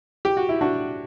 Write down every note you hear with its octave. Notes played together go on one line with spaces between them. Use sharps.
G4
F#4
E4
D4 F#4